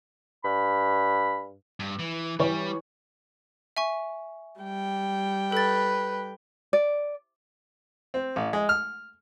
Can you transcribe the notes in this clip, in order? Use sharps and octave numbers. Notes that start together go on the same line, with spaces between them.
G2 B5
G2
E3
E3 G3 B4 C#5
E5 G#5 C#6
G3 G5
A4 B4 A6
D5
C4
A1
G#3
F6